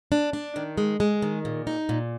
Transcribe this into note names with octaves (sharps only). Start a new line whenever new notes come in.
D4
D4
D#3
G#3
G#3
D#3
A#2
D#4
A#2